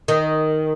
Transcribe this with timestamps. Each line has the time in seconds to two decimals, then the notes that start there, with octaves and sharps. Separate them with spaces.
0.08 D#3